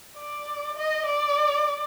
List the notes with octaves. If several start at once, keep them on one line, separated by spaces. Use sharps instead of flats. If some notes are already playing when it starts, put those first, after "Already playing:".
D5
D#5
D5